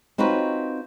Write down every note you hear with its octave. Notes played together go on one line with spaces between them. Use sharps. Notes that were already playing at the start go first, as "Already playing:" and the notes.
C4 D#4 F4 F#4 B4 C#5